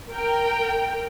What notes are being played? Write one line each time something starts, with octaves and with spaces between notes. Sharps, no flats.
A#4 G5